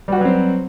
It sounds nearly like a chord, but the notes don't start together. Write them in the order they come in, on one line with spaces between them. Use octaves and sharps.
G3 F#4 B4 F#3 C4